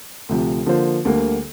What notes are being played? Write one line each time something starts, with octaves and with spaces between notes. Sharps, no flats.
D2 C3 F3
D3 F3 A#3 F4 C5
D2 D3 G3 A#3